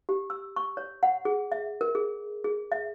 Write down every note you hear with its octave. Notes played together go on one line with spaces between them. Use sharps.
G4
E6
C#6
C#5
F#5
G#4
E5
A#4
G#4
G#4
E5